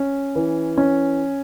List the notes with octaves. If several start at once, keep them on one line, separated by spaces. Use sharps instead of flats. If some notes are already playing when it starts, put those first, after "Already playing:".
Already playing: C#4
E3
C#4